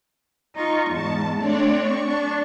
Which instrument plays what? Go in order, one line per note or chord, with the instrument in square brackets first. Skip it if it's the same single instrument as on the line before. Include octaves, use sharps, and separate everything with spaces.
[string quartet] D#4 F4 [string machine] C#6
[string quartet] E2 G#2 [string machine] A5
[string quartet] A3 C4 [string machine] D4 C#5 D5
[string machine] C#6
[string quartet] D4